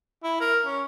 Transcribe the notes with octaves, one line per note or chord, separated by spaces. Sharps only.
E4
A#4
C#4